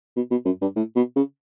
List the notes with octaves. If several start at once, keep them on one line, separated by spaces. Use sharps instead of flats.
B2
B2
F#2
G2
A2
B2
C#3